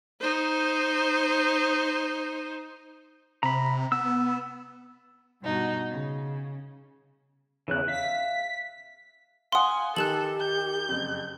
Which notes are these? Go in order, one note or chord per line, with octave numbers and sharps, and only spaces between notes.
D#4 C5
C3 A#5 B5
B3 E6
G2 B2 D#4 F#4
C#3
E2 C#3 E3 F#6
E5 F5 B6
F5 F#5 G#5 C6 D#6
D#3 G4 A4 F#6 E7 F#7
G6
F#1 F2